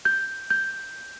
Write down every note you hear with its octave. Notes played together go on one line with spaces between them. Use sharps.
G6
G6